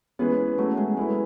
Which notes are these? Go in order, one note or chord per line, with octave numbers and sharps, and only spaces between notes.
E3 G#3 B3 C#4 G#4 B4
F#3 A3 C#4 F#4
G#3
G#3 A3 E4 G#4 B4